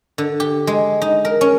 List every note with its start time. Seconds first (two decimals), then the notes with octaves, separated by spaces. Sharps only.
0.18 D3
0.40 G4
0.67 G#3
1.02 D#4
1.25 A#4
1.41 C#4